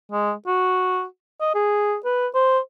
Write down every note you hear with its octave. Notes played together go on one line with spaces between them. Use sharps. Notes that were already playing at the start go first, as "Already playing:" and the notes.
G#3
F#4
D#5
G#4
B4
C5